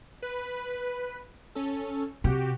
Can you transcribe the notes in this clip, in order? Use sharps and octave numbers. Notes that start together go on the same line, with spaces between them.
B4
C#4 A4
C3 F#4 G4